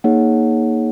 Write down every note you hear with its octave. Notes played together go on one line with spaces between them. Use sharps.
A#3 D#4 G#4 C#5 F#5